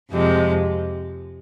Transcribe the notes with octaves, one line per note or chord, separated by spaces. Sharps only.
F2 C3 F3 G#3